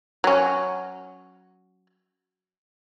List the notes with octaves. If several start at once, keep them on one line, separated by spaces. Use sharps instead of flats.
F#3 C#4